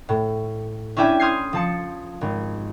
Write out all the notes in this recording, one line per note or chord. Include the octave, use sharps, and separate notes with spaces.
A2
C#4 D4 E4 E5 G5 G#5
C6 D#6 F6 G6 G#6 C7
F3 A5 C#7
G#1